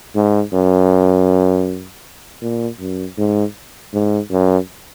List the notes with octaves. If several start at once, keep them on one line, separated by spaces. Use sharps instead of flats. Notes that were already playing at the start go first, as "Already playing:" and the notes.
G#2
F#2
A#2
F#2
G#2
G#2
F#2